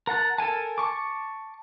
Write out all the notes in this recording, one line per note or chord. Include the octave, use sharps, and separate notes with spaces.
A#4 F#5 A5 F#6
A4 A#4 G#5 A5
A5 C#6 D6